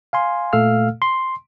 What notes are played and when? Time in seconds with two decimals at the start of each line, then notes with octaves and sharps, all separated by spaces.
0.13 F5 G#5 C6
0.53 A#2 A3 A4 F5 E6 F6
1.02 C6